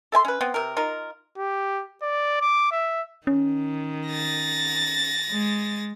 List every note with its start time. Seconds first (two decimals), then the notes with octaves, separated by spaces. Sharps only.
0.12 A4 E5 G#5 C6
0.25 C#4 B4
0.41 B3 C4
0.54 C3 A#4
0.77 D#4 F4 A#4
1.38 G4
2.02 D5
2.41 D6
2.72 E5
3.27 D#3 C#4
4.09 A6 A#6
5.31 G#3